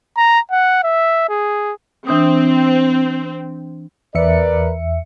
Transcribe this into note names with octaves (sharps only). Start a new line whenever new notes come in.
A#5
F#5
E5
G#4
E3 C4 D4 D#6
E2 A#4 B4 D5 E5 C#7